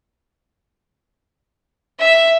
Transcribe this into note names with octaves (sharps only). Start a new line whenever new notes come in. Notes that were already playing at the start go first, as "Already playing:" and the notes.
E5